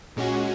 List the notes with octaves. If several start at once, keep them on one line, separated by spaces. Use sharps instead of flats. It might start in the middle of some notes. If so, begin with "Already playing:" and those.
A#2 G#3 C#4 F#4